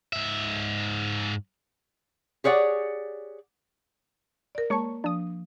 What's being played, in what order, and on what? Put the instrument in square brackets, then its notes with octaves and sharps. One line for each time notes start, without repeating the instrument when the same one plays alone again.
[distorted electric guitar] G#2 E5
[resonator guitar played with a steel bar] G4 G#4 C#5 D5 F#5
[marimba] A#4 D5
[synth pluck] G#3 C#5 C#6 [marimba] A#3 A5
[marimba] F3 [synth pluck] D4 D#6